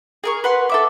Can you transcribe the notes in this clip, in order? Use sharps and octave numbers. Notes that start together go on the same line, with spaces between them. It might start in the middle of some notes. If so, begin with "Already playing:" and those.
G#4 A#4 C#6
B4 F#5 C6
A4 E5 D6